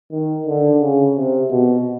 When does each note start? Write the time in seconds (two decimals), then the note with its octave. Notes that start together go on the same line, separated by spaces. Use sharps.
0.12 D#3
0.47 D3
0.81 C#3
1.16 C3
1.51 B2